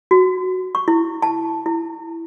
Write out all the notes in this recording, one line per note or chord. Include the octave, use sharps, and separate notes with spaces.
F#4
C#6
E4
A5
E4